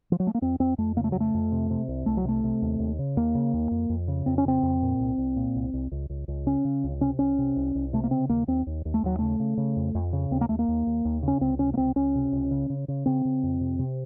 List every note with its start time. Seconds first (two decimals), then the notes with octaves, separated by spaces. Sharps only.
0.12 F3
0.20 F#3
0.27 A3
0.35 A#3
0.42 F2 C4
0.60 F2 C4
0.78 F2 A3
0.97 C#3 A#3
1.04 A3
1.12 F#3
1.15 F2
1.20 A3
1.34 F2
1.52 C3
1.70 C3
1.88 C2
2.06 C2 A3
2.17 F#3
2.25 C3 A3
2.44 C3
2.62 D#2
2.79 D#2
2.99 C#3
3.17 D#2 A#3
3.35 C#3
3.53 D#2
3.71 F2
3.89 F2
4.08 C#3
4.26 F2 C4
4.38 C#4
4.45 C#3 C4
4.63 F2
4.82 A#2
5.00 C2
5.18 C2
5.36 A#2
5.56 C2
5.73 C2
5.92 C#2
6.10 C#2
6.28 C#2
6.46 C#3 C#4
6.65 C#3
6.84 C#2
7.01 C3 C#4
7.19 C2 C#4
7.39 C3
7.56 C2
7.75 C2
7.93 C3 A3
8.04 A#3
8.11 C#3 C4
8.29 D#2 A#3
8.47 D#2 C4
8.67 D#2
8.85 D#2
8.94 A3
9.03 D#2 F#3
9.19 C#3 A3
9.40 C#3
9.58 C#3
9.76 F2
9.95 F2
10.13 C#3
10.31 D#2 C4
10.41 A#3
10.49 D#2 A3
10.59 A#3
10.68 D#2
10.87 D#2
11.05 D#2
11.23 C#3
11.28 C#4
11.41 C#2 C4
11.59 C3 C#4
11.74 A#3
11.77 C#2 C4
11.96 C#2 C#4
12.15 C3
12.32 C#2
12.51 C#3
12.70 C#3
12.88 C#3
13.06 C#3 C4
13.25 C#3
13.43 F2
13.61 C3
13.79 C3